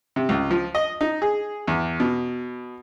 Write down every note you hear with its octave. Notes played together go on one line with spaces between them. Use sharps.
C3
C#2
F3
D#5
D#4
G#4
E2
B2